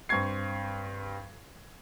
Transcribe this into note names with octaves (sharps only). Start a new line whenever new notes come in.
G2 C4 C#6 G#6 C7